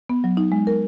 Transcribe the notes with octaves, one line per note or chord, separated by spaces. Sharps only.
B3
F#3
D#4
G#3
A#4